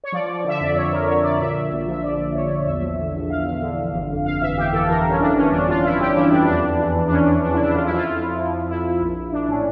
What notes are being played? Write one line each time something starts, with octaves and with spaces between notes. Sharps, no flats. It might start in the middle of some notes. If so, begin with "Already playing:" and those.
C#5
F3 D5
F3
D3 E5
F2 D5
D3 C#5
F2 A#4
D3 C#5
D3 D5
A#2 E5
A#2
A#1
F3 E5
A#1 D5
A#1
A#1 C#5
A#1
E2 E5
F3
D3
E2
E2 F5
E2
D3
D3
G1
F2
G1 F5
E3 E5
G1 G4
E3 A4
E3 A#4
E3 C#4
E3 D4
G1 C#4
F2 D4
G1 F4
G1 E4
G1 G4
E3 E4
F2 D4
E2 D4
E2
E3
E2
D4
E3 C#4
E2
E2 D4
E4
C#3
D4
F2 F4
E4
F3
F4
F2 F4
F2
F3
F3
F2 E4
F2
A#1
A#1
A#1 D4
A2 C#4